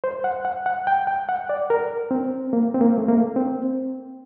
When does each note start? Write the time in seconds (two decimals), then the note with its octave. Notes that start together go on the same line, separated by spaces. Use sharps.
0.04 C5
0.24 F#5
0.45 F#5
0.66 F#5
0.87 G5
1.07 G5
1.29 F#5
1.49 D5
1.70 A#4
2.11 C4
2.53 A#3
2.74 C4
2.81 A#3
2.98 A3
3.08 A#3
3.36 C4